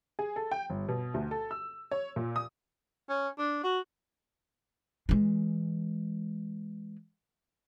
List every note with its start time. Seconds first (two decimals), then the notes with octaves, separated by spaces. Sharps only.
0.19 G#4
0.36 A4
0.51 G5
0.70 G1
0.88 B2
1.14 D2
1.31 A4
1.51 E6
1.91 C#5
2.16 A#2
2.36 D#6
3.09 C#4
3.38 D4
3.63 F#4
5.09 E3 G#3